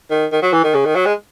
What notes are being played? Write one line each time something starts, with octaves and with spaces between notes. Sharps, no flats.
D#3
D#3
F#3
E3
D#3
C#3
D#3
F#3
G#3